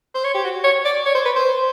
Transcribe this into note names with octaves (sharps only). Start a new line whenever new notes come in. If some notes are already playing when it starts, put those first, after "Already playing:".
C5
C#5
G4
F#4
C#5
D5
C#5
C5
B4
C5